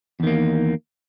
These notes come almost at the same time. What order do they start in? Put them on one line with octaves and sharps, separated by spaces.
E2 D#3 A#3